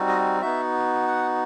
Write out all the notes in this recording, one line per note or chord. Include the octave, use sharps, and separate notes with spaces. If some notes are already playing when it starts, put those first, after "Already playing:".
Already playing: G3 C4 D#4 F#4
D#5
B3 D#4 F#4 E5
F#5